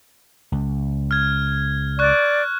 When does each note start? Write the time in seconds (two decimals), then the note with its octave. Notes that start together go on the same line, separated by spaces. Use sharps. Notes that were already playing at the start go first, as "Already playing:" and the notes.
0.52 C#2
1.11 F6 G#6
1.99 D5 C#6 F#6